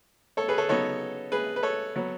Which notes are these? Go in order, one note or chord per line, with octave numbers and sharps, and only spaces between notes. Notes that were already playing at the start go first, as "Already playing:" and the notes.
A4 C#5
G#4 B4
A4 C#5
C#3 F#3 B3 D#4 A4 C#5
G#4 B4
B4
A4 C#5
F#3 B3